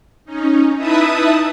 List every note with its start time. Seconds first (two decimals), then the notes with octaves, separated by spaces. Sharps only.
0.25 C#4 D#4
0.76 D#4 E4 B4 E5 A5 D#6